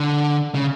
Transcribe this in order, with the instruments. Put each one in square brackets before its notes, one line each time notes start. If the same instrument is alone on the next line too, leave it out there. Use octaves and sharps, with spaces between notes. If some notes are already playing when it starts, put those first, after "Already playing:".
Already playing: [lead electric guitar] D3
C#3